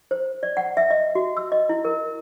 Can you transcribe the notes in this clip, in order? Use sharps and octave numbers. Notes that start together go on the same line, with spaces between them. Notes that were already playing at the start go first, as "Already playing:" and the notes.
C5
D5
F#5
E5
D#5
F#4
E6
D#5
E4
A#4